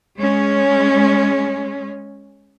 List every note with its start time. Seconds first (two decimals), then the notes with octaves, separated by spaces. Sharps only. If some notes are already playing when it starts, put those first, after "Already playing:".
0.17 G#3 C#4